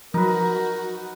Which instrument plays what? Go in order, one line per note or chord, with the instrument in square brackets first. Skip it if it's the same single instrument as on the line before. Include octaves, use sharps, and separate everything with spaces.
[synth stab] F3 F#3 [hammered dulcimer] D#4 B4 [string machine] F#4 [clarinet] A#4